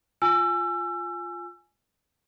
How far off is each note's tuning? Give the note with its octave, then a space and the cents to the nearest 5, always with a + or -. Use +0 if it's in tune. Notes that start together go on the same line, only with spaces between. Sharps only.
F4 +0 G#5 +0 E6 +30